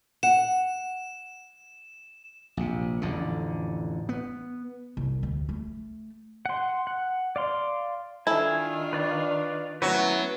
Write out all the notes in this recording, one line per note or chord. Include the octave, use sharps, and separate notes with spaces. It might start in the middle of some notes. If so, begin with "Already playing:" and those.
F#5 E7
A#1 C3
A1 F2 D3
B3
C2
D2
A3
F#5 C6
F#5
D5 F5 C6
D#3 D4 E4 F4 A4 G#5
B4 D5 F5
F#3 A3 B3 C#4 E4 B4